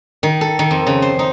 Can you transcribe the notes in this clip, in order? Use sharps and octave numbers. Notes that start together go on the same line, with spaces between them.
D#3
A4
D#3
F2
C#3
C5
D#4